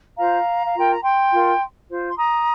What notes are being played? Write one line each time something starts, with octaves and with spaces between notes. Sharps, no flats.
F4 C5 F5 A#5
F5
F4 A#4 G5
A#5
G5 C6
F4 A#4
F4 C5
C6
A#5 D#6